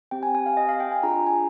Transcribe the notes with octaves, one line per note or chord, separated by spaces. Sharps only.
C4 G4 G5
G#5
G#5
F5
D#5
F5
G5
G#5
D4 F4 G#4 A#5
A#5
G#5